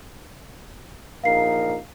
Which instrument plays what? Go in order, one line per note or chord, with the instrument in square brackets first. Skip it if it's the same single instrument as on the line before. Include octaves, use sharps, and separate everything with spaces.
[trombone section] A#1 D#4 A#4 [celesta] F5 C7